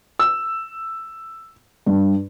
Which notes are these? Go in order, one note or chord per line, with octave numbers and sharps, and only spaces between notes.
E6
G2